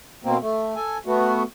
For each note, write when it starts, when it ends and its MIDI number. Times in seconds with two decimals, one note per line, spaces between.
0.24 0.37 47
0.24 0.37 58
0.24 0.37 60
0.41 0.75 57
0.76 0.98 69
0.76 0.98 80
1.06 1.43 57
1.06 1.43 59
1.06 1.43 66